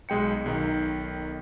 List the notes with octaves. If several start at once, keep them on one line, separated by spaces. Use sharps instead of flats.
B1 G#3 G5 C#7
B1 D#3